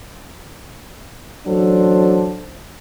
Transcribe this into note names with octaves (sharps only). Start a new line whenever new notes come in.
A1 F#3 D4 A4 C5